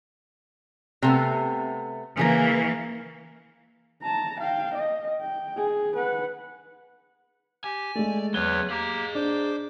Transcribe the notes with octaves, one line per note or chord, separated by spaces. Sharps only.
C3 A3 B3
C#3 E3 A#3 G#4 A#4
A5 A#5
F5 G5
D#5
G5
G#4
B4 F#5
G4 G#5
G#3 A3 D5
E2 F#3 G#4 B4 C#5 G7
A#3 G4 G#4 A#5
D4 C5 D6